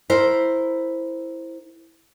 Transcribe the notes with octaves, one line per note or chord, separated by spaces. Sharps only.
E4 A#4 C5